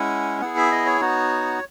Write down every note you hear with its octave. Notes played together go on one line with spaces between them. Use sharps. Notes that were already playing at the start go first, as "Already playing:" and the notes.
Already playing: G#3 C#4 E4 F#5
B3 E4 G#4 F#5
E5
D#5
C#5
B3 D#4 F#4